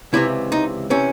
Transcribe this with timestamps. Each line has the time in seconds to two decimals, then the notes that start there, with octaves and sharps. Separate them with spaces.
0.13 C#2 C3 E3 E4
0.52 D#4
0.90 C3 E3 C#4